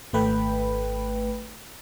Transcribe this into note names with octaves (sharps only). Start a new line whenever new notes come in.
G#1 A3 B4 G5 B5